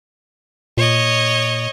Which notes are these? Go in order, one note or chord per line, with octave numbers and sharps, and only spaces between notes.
A#2 C#5 D#5